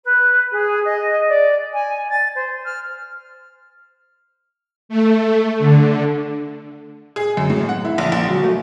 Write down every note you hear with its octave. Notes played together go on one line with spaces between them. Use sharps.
B4
G#4
D#5
D5
G#5
A6
C5
F6
A3
D3
G#4
F#2
A2
F#5
E4
A#1
A#1
F#3
A3